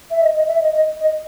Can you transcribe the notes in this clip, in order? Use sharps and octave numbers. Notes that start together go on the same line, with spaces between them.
E5
D#5
D#5
E5
D#5
D#5
D#5